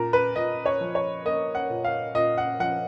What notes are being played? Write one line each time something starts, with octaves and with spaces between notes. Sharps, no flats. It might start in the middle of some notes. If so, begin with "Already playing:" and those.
Already playing: A#2 A#3 A#4
B4
A#2 D#5
C#5
F3
C#5
A#3 D#5
F#5
A#2
F5
A#2 D#5
F#5
F3 F#5